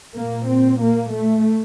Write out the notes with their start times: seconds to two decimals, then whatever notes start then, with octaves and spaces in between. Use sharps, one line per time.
0.16 A#2 A#3
0.49 C4
0.81 A#3
1.12 A3